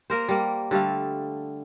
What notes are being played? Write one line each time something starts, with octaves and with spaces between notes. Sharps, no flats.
A#3 A#4 C5
G3 A#3
D3 G3 A3 F5